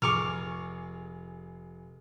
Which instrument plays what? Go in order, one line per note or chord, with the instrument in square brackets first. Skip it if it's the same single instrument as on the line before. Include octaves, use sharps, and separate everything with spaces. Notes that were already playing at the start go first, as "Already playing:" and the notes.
[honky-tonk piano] F1 G#4 [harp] C#6 D6 F6